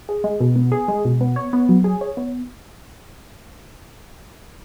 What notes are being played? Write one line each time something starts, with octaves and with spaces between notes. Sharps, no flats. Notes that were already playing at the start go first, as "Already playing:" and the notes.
G#4
G#3
B2
B3
G#4
G#3
B2
B3
C#5
B3
F#3
G#4
C#5
B3